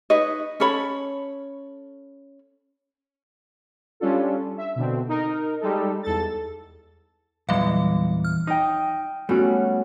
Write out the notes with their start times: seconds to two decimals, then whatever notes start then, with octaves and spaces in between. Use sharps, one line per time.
0.10 D#4 B4 C#5 D#5
0.60 C#4 A4 C#5 B5
4.00 G3 C#4 D4 F4 A4
4.57 E5
4.76 B2 D3 C4
5.09 D#4 A#4
5.60 G3 G#3 D#4 A4
6.03 E2 A4 A6
7.49 E2 A#2 E3 F#3 G3 F5
8.25 F6
8.47 D#4 G5 D#6
9.29 G3 A3 B3 C#4 F#4